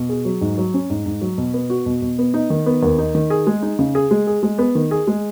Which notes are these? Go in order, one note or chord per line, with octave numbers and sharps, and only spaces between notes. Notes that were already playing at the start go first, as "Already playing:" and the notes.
Already playing: B2
G#4
F#3
G#2
F#3
C#4
G#2
G#2
F#3
B2
B3
F#4
B2
B2
B3
D#4
D#3
B3
D#2
D#4
D#3
G#4
G#3
D#4
C#3
G#4
G#3
G#4
G#3
B3
D#3
G#4
G#3